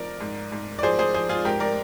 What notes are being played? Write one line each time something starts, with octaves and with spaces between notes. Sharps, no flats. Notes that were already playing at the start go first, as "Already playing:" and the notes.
Already playing: F3 A#4 D5
G#2
G#2
D5
F3 G#4 C5
G#4 C5
F3 G#4 C5
F4 G#4
G#2 G4 A#4
A#4 D5